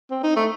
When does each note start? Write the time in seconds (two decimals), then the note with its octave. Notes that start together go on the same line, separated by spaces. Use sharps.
0.11 C4
0.23 D#4
0.36 A3